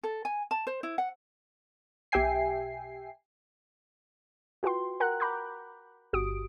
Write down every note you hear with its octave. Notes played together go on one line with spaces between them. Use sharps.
A4
G#5
A5
C5
E4
F#5
B1 G4 E5 G5 G#5 C7
F4 F#4 B4 G5 C6
A#4 F#5 G5 A#5 F#6
A#5 B5 D6 G6
G1 F#4 G4 D#6 D7